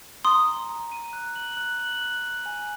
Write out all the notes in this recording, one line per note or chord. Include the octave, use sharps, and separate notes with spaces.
A#5 C6 D#6
A#5
A#5
D#7
F#6
F#7
F#6
F#7
F#6
F#6
G#5